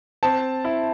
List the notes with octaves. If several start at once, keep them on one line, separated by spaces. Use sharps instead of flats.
C4 A5
E4